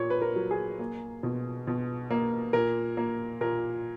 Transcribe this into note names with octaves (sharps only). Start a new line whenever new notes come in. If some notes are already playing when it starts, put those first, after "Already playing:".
Already playing: A#2 A#3 C#5
B4
A#4
F#3
G#4
A#3
B2
B2
A#3
A#2 A#4
A#3
A#2 A#4